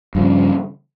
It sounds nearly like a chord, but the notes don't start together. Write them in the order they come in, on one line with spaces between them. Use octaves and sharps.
G2 F3 C#3